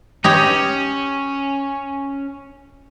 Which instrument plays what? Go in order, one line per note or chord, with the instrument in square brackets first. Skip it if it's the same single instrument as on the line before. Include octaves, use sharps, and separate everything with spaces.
[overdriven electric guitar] C#4 [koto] D#4 G4 C#5